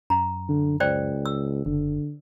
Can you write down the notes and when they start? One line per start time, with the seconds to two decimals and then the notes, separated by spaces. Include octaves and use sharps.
0.10 F#2 A#5
0.49 D3
0.80 C#2 C5 D5 G5
1.26 E6
1.66 F#1 D3